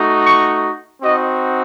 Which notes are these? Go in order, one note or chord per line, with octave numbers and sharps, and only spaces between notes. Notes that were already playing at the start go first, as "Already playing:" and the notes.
Already playing: A3 D#4 F#4
C#6
C4 D#4 F#4 D#5